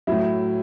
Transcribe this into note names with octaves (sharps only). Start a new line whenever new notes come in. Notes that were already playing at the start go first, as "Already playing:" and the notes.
A2 F#3 E4